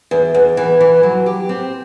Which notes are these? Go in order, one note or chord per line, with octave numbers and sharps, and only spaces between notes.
E2
E2
E3
E3
F#3
G4
C4